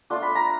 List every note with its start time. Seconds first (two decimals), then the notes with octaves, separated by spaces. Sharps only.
0.10 A3 D4 F4 C6
0.23 B5
0.35 A#5